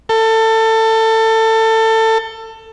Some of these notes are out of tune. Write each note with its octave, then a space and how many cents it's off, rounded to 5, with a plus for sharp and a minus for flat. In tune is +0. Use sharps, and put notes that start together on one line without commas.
A4 +20